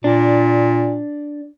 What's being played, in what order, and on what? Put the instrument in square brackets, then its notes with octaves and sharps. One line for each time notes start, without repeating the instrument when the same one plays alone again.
[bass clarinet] A#2 [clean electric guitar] D4